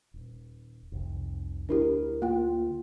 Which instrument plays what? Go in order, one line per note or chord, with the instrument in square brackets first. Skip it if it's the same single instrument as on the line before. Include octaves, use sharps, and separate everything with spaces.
[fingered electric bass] D#1
F1 C2
[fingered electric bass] D2 [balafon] D4 E4 G4 [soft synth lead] A#4
[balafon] A#3 G5 [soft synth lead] F4